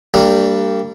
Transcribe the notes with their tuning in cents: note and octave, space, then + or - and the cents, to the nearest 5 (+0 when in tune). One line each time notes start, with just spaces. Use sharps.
G3 +0 A#3 -35 D4 +0